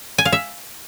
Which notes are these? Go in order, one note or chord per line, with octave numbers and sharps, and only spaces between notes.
G#5
F5
E5